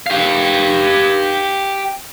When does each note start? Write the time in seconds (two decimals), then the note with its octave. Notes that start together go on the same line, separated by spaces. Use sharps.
0.06 G4 F5